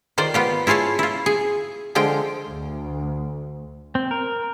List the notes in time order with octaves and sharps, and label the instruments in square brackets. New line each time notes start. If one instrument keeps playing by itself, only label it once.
[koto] D#3 F4 C5 D5
B3 F4 G4
E4 F4 G#4 C#5 A5
E4 F4
G#4
D3 F3 G#3 G5
[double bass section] D2
[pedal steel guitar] C4
A#4